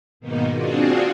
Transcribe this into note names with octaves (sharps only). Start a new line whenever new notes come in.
G#2 B2 D#3 A#3 B3 D#4
C4 D4 F4 F#4 G#4